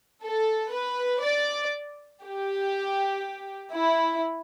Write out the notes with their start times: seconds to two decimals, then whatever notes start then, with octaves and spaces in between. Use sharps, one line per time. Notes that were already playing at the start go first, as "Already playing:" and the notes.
0.23 A4
0.72 B4
1.23 D5
2.23 G4
3.73 E4